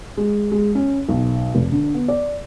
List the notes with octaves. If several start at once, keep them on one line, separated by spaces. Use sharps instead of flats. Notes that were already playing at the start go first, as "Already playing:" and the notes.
G#3
G#3
C#4
B1
F1
D3
B3
D5